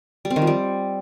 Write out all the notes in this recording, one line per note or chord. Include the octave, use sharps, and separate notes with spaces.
G3
C4
D#3
F3
G3